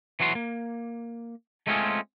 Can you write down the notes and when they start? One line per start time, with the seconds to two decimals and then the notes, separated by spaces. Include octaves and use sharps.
0.20 E3 F#3 F#4 C6
0.35 A#3
1.67 G#3 A3 C4 C#4 F4 G#4